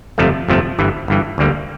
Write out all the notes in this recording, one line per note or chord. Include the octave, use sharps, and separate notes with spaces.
G1 F2 C3 F3 A3
G1 F2 C3 F3 A3
G1 G2 E3
G1 G2 E3
D2 D3 G3 A#3